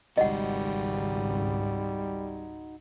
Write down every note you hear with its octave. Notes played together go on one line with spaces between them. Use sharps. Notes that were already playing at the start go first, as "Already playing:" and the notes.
G#1 C#2 G#2 G3 D#4 F#4 D#5 F#5